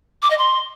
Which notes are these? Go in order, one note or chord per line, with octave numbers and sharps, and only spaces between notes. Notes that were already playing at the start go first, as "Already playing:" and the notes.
D6
D#5
C6